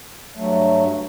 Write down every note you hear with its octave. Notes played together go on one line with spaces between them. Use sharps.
G2 F#3 A3